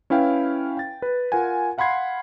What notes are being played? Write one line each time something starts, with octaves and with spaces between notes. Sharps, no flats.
C#4 E4 B4 F5 G5
G5 A6
B4
F4 A#4 F#5 G#5
F5 F#5 B5 C6 G#6 C7